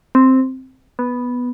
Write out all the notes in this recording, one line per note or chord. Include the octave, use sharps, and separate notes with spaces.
C4
B3